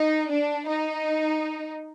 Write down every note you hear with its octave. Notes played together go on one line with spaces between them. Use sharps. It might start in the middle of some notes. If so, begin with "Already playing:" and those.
Already playing: D#4
D4
D#4